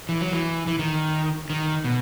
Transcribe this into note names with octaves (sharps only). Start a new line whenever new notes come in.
E3
F#3
E3
E3
D#3
D#3
B2